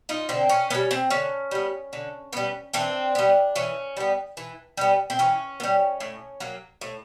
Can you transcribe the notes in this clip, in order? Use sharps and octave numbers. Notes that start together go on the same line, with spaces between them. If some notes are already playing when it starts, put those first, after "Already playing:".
D#4 F4
D3 C4
C#4
G3 B3 C#4
C4
D3 C#4
G3 B3
D3
G3 B3
E3 C4 D4
G3 B3
E3 C#4
G3 B3
E3
G3 B3
C4
E3 C#4
B3
G3
A2
F#3 A#3
A2